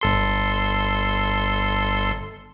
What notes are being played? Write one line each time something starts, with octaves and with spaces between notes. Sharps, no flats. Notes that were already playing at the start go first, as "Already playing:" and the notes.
G1 A4 C6